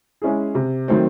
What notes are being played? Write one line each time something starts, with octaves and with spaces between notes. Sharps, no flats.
G#3 C#4 E4 G#4
C3
D#3 F#3 A3 C4